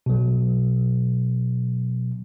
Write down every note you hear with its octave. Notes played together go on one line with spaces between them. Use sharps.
B2 F#3